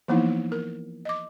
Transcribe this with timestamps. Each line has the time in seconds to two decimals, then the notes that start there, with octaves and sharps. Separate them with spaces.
0.08 E3 F3 A#3 B3 D#4 E4
0.52 A#4
1.05 D#5 D6